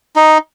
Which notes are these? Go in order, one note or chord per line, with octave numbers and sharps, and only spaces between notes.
D#4